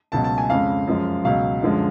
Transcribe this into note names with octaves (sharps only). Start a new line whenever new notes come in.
C#2 B2 F#3 A5
A5
G#5
F2 C#3 G#3 F5
F#2 F3 G#3
C#2 B2 F#3 F5
F#2 D3 F3 G#3